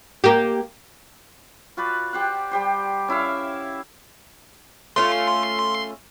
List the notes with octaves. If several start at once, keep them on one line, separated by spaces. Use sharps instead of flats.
A#3 G4
F4 F#4 B4 D5
G4 C5 F#5
G3 G4 C5
C#4 E4 E5 F5
A3 C#4 F4 C6